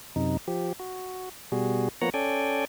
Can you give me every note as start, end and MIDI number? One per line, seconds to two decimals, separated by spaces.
0.16 0.37 42
0.16 0.37 48
0.16 0.37 63
0.48 0.73 53
0.48 0.73 67
0.80 1.29 66
1.52 1.88 47
1.52 1.88 55
1.52 1.88 66
1.52 1.88 68
2.01 2.10 53
2.01 2.10 58
2.01 2.10 59
2.01 2.10 73
2.01 2.10 78
2.01 2.10 82
2.14 2.65 61
2.14 2.65 69
2.14 2.65 74
2.14 2.65 79
2.14 2.65 80